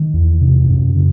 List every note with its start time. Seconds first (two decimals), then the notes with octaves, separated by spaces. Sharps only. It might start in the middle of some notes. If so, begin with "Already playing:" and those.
Already playing: D#3
0.14 E2
0.41 C3
0.69 F#2
0.96 C#3